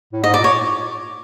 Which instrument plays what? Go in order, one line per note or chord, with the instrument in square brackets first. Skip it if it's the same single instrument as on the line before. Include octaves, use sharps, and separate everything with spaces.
[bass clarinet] A2
[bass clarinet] G#2 [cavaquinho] D#5
[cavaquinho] D5
[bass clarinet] A#2
[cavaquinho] C#5